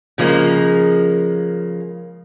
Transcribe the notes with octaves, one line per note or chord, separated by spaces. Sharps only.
C#3 F3 G#3 A#3